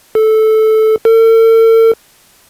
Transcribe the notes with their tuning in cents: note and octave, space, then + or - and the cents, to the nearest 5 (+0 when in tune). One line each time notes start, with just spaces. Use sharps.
A4 -10
A4 +45